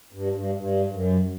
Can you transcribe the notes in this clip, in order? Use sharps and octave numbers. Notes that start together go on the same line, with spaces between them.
G2
G2
G2
F#2